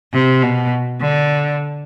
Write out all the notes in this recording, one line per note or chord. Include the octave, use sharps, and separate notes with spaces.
C3
B2
D3